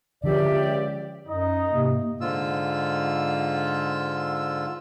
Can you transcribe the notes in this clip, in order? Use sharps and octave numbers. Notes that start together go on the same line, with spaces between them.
C#2 D3 F3 G4 D5 E5
F#2 D#4 D#5
G#2 C3 A#3
G#2 D3 F4 E6